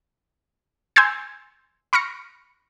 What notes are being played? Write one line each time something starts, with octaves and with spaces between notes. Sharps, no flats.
G#5 C6 E6 G6 G#6 C7
B5 C#6 F6 A#6 C#7